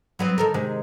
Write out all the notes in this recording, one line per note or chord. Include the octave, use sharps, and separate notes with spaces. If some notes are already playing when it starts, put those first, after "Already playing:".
F#3 B3 C4
D#3 A4 A#4
C3 D#3 G#3